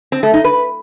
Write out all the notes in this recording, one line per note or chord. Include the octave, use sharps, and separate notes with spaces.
C4
A3
D#4
B4